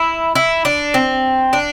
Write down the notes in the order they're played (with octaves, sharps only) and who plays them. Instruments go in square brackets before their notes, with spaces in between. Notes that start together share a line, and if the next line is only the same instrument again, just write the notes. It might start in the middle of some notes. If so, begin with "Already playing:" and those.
Already playing: [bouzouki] E4
E4
D4
C4
D4